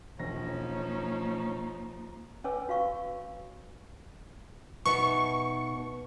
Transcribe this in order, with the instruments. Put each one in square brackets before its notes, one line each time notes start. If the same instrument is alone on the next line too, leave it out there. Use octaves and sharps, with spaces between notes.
[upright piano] E1 A#6 [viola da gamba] F3 [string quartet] A#3 D#4 [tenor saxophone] C#4
[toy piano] C#4 B4 C#5 G#5 D6 E6
F#4 F5 C#6
[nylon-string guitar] B2 D#4 E5 [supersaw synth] C#6